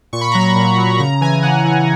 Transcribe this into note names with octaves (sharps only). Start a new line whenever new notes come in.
A#2 C#6
B5
F#3 A#5
B5
A#2
F#3
C#3 A#5
E3 G#5
C#3 F#5
E3